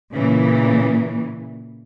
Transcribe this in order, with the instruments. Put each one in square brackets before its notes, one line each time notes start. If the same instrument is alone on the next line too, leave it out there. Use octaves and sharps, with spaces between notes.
[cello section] A#2 C#3 E3